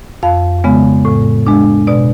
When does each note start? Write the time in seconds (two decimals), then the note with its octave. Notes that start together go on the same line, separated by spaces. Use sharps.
0.23 F2 F5
0.64 C#3 G#3 B3
1.05 A2
1.47 G#3 D4
1.87 B2 D5